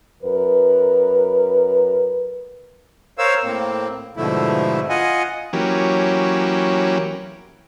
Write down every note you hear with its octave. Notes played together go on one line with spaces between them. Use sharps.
F#2 A#4 B4
A#4 C5 C#5 F5 E6
A2 A#3 C4
G#2 B2 D3 F3 A3 E4
F4 D#5 F#5 G#5
E3 F#3 A#3 C#4 G4